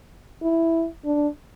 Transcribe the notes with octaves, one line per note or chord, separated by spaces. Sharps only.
E4
D4